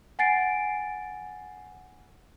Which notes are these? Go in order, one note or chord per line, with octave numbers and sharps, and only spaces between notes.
F#5 G#5 A6 C7 D7